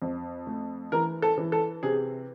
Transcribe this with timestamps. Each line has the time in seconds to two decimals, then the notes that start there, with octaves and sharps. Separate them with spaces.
0.02 F2
0.47 A3
0.92 E3 A#4
1.22 A4
1.38 E3
1.52 A4
1.83 C3 G#4